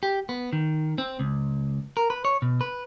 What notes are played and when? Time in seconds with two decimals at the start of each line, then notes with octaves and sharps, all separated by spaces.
0.03 G4
0.29 B3
0.53 D#3
0.98 C4
1.20 C#2
1.97 A#4
2.10 B4
2.25 C#5
2.42 B2
2.61 B4